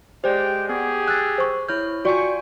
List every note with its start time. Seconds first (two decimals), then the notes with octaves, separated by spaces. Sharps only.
0.24 G#3 G4 C5 D5 G5
0.69 B3 G4 G#4
1.08 E6 F#6 A6
1.38 C5 C#6
1.69 E4 C#5 F6 G6
2.05 F4 F#4 D5 G5 G#5 C#6